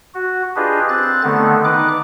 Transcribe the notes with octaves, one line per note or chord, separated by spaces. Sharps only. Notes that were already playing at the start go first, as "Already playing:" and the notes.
F#4
D4 F4 G4 G#4 B4 D#5
C4 F#6 A6
D3 D#3 A3 B3
D#4 B4 D6 F#6